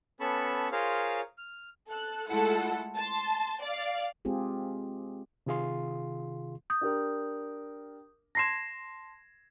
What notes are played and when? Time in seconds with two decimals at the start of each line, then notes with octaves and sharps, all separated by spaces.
0.20 B3 C#4 A4 A5 B5 C#6
0.72 F4 G#4 A#4 C5 C#5 F5
1.38 F6
1.88 A4 F#6
2.28 G#3 A3 E4 F4 A4 F#5
2.96 A5 C6
3.62 D5 F5
4.25 G#3 C4 F4 G4 G#4
5.46 C3 D#3 F4 G#4 F5 C6
6.70 D#6 G6
6.81 D4 G4 A#4
8.35 A5 C6 G#6 A#6 C7 E7